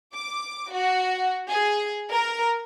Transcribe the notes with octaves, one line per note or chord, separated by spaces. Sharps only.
D6
F#4
G#4
A#4